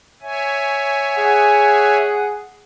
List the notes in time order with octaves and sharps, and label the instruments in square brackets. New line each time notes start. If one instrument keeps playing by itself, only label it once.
[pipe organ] C#5 E5 G#5
[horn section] G#4 F#5